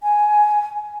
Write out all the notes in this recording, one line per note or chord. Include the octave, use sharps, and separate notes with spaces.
G#5